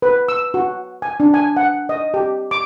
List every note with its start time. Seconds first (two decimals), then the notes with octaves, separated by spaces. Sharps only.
0.02 B4
0.28 E6
0.54 F#4
1.02 G#5
1.20 D4
1.34 G#5
1.57 F#5
1.89 D#5
2.14 G4
2.51 D6